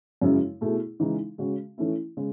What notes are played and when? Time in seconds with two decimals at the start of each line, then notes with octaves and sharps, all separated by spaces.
0.21 F#2 C#3 G#3 C#4 E4
0.61 B2 A3 E4 G#4
1.00 C#3 E3 G#3 D#4
1.38 C#3 G#3 C#4 F#4
1.78 E3 A3 C#4 E4
2.17 C#3 G#3